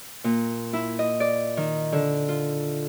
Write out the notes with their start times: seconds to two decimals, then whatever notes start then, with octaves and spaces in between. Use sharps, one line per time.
0.24 A#2
0.73 E4
0.99 D#5
1.20 D5
1.57 D#3
1.92 D3
2.29 F4